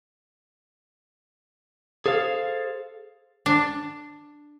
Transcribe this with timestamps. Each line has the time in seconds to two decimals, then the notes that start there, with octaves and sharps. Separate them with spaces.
2.06 G#4 A4 C5 F5
3.46 D4